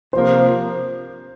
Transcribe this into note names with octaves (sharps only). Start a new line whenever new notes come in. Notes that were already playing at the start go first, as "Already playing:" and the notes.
C3 F3 A#3 C5